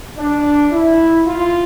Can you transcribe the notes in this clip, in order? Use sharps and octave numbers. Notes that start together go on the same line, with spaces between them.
D4
E4
F4